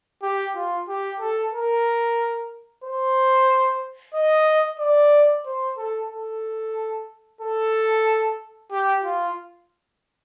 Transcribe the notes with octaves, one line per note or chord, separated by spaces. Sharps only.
G4
F4
G4
A4
A#4
C5
D#5
D5
C5
A4
A4
A4
G4
F4